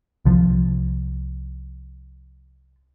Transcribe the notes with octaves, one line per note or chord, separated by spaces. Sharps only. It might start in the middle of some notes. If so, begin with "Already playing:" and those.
C2 F3